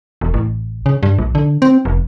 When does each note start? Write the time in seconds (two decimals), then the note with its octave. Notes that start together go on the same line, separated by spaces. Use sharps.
0.21 E1
0.34 A1
0.86 C#3
1.03 G2
1.19 A#1
1.35 D3
1.62 C4
1.85 F1